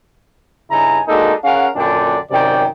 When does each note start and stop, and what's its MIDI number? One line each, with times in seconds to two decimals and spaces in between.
0.71 1.01 43
0.71 1.01 49
0.71 1.01 63
0.71 1.01 64
0.71 1.01 80
0.71 1.01 82
1.08 1.33 56
1.08 1.33 58
1.08 1.33 62
1.08 1.33 63
1.08 1.33 66
1.08 1.33 69
1.44 1.68 61
1.44 1.68 68
1.44 1.68 70
1.44 1.68 77
1.44 1.68 78
1.76 2.17 42
1.76 2.17 46
1.76 2.17 50
1.76 2.17 62
1.76 2.17 74
1.76 2.17 79
2.31 2.64 42
2.31 2.64 48
2.31 2.64 51
2.31 2.64 74
2.31 2.64 79